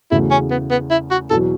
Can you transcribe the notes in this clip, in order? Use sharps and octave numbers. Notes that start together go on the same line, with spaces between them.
E2 C#3 A3 E4 F#4
C#4
B3
B3
E4
F#4
E2 B2 F#3 A4